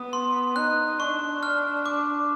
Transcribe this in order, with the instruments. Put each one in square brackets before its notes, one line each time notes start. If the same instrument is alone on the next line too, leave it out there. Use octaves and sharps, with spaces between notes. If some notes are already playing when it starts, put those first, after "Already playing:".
Already playing: [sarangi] B3 [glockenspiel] D#6
[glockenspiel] C6
[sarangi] D#4 [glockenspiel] F#6
[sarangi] D4 [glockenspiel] C#6
[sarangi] D4 [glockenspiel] F6
[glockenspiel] D6